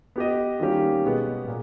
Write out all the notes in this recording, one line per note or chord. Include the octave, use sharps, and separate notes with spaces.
B3 G4 B4 D#5
D#3 G3 A#3 C#4 G4
B2 G#3 B3
A#2